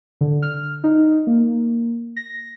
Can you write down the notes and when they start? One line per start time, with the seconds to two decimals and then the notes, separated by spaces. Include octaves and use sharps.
0.21 D3
0.42 F6
0.84 D#4
1.27 A#3
2.16 A#6